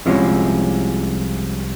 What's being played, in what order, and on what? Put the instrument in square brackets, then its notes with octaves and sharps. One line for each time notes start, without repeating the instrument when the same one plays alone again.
[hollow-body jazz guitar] C2 C3 F3 G#3 C#4